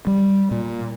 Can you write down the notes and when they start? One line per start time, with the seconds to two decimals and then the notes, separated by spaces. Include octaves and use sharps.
0.07 G3
0.51 A#2